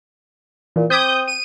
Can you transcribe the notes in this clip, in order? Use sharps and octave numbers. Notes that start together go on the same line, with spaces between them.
A#2 E3
C4 D6 D#6 G6 G#6 B6
D#7